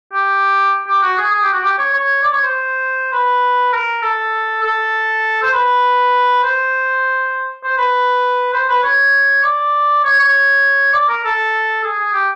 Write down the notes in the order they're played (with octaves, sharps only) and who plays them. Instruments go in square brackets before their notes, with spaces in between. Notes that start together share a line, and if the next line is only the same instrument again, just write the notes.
[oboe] G4
G4
F#4
G#4
G#4
G4
F#4
G4
C#5
C#5
D5
C#5
C5
B4
A#4
A4
A4
C5
B4
C5
C5
B4
C5
B4
C#5
D5
C#5
C#5
D5
A#4
A4
G#4
G#4
G4